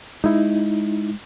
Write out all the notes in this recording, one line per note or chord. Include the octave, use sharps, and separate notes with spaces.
G#3 D#4 E4